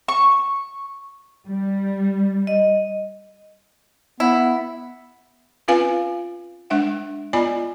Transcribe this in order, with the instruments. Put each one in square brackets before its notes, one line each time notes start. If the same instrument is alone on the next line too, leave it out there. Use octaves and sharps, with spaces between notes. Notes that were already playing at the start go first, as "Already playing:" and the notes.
[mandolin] C#6
[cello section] G3
[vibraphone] D#5
[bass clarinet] B3 [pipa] E4
[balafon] C4 C#4 F4 B4 F5 G#5
G#3 D4 E5 F#5
B3 F4 D5 D#5 G#5 B5